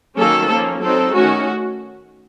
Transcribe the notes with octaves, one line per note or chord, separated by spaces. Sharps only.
D#3 F#3 A#3 C#4 A4
F3 A#3 C#4
F#3 C4 D#4 A4
D#3 A3 C#4 F#4